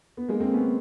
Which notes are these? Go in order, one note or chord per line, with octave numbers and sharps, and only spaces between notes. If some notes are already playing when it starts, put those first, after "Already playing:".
B3
G#3 A#3
A#3 C4
B3 C#4